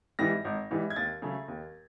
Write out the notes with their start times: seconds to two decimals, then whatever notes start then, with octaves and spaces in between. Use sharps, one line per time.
0.19 G#2 E3 G3 A#6
0.45 G#1
0.71 G#2 E3 G3
0.90 G#6
0.96 D#2 A6
1.22 C#3 F#3 A3
1.48 D#2